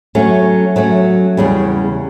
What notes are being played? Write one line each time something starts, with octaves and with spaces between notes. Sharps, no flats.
F#3 A3 C#4
F#3 A3 C#4
E2 C#3 G3